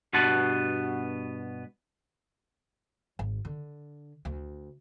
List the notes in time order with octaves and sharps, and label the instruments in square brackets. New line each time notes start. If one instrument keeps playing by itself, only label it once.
[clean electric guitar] G2 B2 B3 F#4 A5 B5
[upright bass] G#1
D3
D2